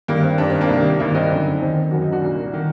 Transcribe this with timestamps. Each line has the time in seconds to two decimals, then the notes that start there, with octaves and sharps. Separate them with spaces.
0.08 G2 D#3 A#3
0.23 C4
0.38 G2 D#3 D4
0.50 C4
0.61 A#3 D4
0.69 C2 C3 D#3
0.99 G2 D#3 A#3 D4
1.14 C4 D#4
1.30 F#2 D3
1.61 D#2 D#3 C4 D#4
1.91 F#2 D#3 F#4
2.02 D#4
2.12 D4 F#4
2.22 C2 A#2
2.54 D#3